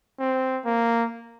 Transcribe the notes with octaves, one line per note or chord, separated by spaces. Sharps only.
C4
A#3